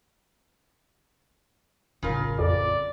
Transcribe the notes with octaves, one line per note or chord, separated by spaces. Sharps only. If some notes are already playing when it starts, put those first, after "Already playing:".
A1 F#2 C#3 F4 A#4
F2 D5